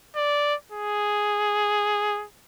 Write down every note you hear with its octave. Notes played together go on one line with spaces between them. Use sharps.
D5
G#4